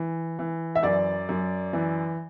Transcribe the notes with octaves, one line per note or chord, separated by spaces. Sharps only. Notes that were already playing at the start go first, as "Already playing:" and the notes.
Already playing: E3
E3
E5
F#2 D5
F#2
E3